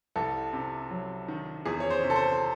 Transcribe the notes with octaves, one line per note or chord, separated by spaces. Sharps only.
C2 A4
C3
F#3
D#3
E2 G#4
C#5
C5
C3
A4
C5